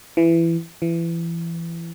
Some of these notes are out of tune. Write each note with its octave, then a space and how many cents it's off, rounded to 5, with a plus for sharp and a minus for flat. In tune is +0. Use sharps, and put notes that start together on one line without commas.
E3 +15
E3 +25